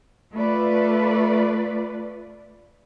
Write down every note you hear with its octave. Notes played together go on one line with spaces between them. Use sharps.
A3 F4 B4 D5